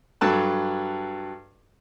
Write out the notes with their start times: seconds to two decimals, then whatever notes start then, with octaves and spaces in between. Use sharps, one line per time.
0.21 G2 F#3 A4 A5 F#6